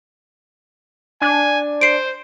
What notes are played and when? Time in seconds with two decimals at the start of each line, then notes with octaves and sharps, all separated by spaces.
1.22 D4 G#5
1.81 C5 C7 D7